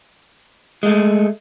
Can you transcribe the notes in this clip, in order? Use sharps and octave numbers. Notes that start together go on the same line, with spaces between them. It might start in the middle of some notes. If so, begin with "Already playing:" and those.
G#3 A3